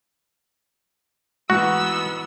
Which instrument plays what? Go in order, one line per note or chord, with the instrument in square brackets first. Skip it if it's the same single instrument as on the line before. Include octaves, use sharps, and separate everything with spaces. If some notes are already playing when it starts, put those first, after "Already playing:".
[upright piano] G#2 E3 [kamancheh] B3 E6 [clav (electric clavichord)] F#4